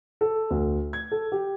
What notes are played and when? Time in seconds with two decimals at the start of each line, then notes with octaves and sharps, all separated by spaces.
0.21 A4
0.50 D2
0.93 G#6
1.12 A4
1.32 G4